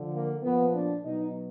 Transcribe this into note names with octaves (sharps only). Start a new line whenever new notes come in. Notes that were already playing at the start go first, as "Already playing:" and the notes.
Already playing: D3 F3
A#3
A#2 F3 B3
D4
B2 F#3 D#4